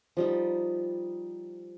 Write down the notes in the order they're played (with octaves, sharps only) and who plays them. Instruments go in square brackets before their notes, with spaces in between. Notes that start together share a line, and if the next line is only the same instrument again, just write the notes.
[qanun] F3 G3 D#4